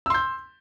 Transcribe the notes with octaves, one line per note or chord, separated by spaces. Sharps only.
C6 E6 G6